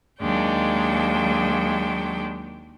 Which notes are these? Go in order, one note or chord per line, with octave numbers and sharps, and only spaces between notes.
D#2 F#3 G#3 D4 G5